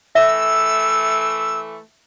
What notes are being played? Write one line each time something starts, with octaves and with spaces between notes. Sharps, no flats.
E3 A3 E5 E6